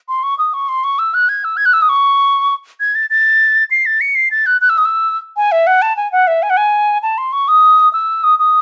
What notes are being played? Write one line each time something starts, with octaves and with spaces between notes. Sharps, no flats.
C6
C#6
D#6
C#6
C6
C#6
E6
F#6
G#6
E6
G#6
F#6
E6
D#6
C#6
G#6
A6
A6
C7
A6
C#7
C7
A6
F#6
F#6
E6
D#6
E6
G#5
E5
F#5
A5
G#5
F#5
E5
G#5
F#5
G#5
A5
C6
C#6
D#6
E6
D#6
D#6